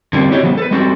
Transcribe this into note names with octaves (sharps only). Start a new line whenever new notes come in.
D3 G3 A#3 C4
E4 F#4 G4 C#5 D#5
D3 F3 G3 B3
A4 B4
G3 G#3 C4 F#4 G4 A4